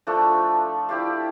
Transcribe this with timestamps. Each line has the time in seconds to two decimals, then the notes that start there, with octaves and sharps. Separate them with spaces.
0.07 F3 A3 D4 A4
0.89 E4 G4 D5 F5